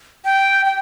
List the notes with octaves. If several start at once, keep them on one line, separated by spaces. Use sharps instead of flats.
G5
G5